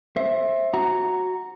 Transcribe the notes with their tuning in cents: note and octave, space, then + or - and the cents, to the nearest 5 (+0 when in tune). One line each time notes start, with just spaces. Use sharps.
C5 +25 E5 +0
F#4 -5 A#5 +0